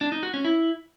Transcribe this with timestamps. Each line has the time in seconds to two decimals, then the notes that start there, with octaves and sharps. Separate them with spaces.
0.01 D4
0.12 D#4
0.23 F#4
0.34 C#4
0.45 E4